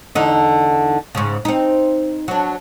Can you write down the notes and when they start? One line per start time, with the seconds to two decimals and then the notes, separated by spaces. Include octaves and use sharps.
0.15 E2 D3 D#4
1.15 G#2 C#3
1.45 C4 D#4
2.28 F#3 D4